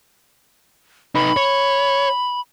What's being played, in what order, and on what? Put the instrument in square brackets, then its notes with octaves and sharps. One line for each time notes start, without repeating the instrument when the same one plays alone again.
[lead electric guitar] D#4 B4 [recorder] B5
[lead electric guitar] C#5